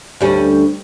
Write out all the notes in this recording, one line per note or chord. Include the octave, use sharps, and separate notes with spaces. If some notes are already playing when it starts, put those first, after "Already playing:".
D2 G3 C#4